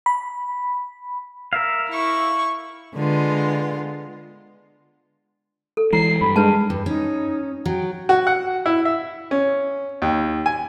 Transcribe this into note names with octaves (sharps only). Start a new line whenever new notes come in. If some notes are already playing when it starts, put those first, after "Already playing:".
B5
A#4 E5 F5
E4 C#6
D3 G#3 B3 F4
A4
E3 G#3 E4 A#5 C7
G2 B5
G#3 D4 B4 A5
G2
C#4 D#4
F#3 G5
F#4
F#5
E4
E5
C#4
D#2
G#5